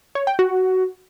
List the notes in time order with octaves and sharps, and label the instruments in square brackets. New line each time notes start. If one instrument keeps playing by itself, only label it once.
[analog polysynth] C#5
G5
F#4